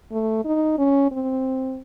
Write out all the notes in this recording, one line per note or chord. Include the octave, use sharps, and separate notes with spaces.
A3
D#4
C#4
C4